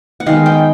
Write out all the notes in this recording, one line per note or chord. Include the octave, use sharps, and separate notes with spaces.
F#5
D#3 G#3 B3 F5
G5